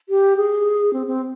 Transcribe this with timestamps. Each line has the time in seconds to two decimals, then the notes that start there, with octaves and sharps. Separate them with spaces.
0.09 G4
0.37 G#4
0.93 C4
1.07 C4